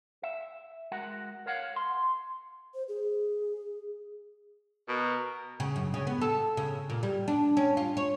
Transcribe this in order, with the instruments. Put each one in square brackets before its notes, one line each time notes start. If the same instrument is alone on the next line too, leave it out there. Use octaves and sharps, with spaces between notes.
[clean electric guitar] E5
G#3 F#4 A#4 F#5
A#4 C#5 F5 F#5
C6
[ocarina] C5
G#4
[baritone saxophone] B2 [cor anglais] A#4
[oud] C#3
F#2
C#3
B3
A4
C#3
A#2
G3
D4
C#4
F4
C#5